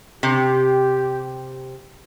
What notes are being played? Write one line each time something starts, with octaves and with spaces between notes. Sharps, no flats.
C3 G4